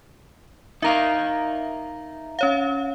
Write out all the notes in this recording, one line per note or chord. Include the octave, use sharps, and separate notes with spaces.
D#4 A#4 E5 F5 A#5
C#4 C#5 F5